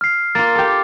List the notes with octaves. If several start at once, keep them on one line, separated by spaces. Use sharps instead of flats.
F6 C7
A#3 F4 A6
G4 A4